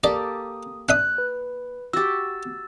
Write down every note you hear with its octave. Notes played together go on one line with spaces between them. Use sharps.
A#3 G4 A4 D5 D#6
D4 E5 D#6 F#6
B4
F#4 G4 E6 A6